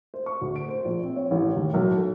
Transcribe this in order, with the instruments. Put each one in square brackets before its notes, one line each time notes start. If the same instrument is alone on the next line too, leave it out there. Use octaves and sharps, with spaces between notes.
[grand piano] C5
C#6
D2
D7
C5
A#1
C4
C#5
A1
D#2
B1
A4